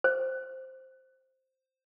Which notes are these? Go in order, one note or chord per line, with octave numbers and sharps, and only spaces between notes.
C5